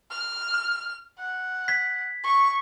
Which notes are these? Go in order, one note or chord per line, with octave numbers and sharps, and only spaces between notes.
F6
F#5
G#6 B6
C#6